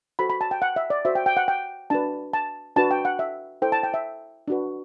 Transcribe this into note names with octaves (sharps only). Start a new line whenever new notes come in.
F#4 A4 C5 B5
B5
A5
G5
F#5
E5
D5
F#4 C5 E5
G5
G5
F#5
G5
D4 F#4 B4 A5
A5
D4 F#4 B4 A5
G5
F#5
E5
E4 A4 C5 G5
A5
G5
E5
D4 F#4 B4